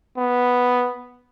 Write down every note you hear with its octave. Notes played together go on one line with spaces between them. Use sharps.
B3